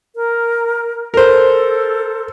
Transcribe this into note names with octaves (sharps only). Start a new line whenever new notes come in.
A#4
A4 A#4 C5